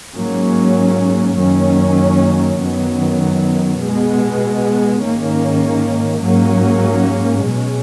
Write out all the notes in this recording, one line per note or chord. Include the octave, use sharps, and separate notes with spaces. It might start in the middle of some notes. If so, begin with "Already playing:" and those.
G#2 F#3 A#3 C#4
F#2 D#3 F#3 A#3 C#4
F#2 D#3 F#3 B3
B2 G#3 B3
G#2 D#3 A#3 C#4
G#2 F#3 A#3 C#4
B2 G#3 C#4